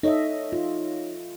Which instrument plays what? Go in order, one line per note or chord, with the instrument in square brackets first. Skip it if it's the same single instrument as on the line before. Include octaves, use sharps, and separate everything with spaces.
[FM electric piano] D#4 C#5 [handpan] A4 D#5 E5
[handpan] F4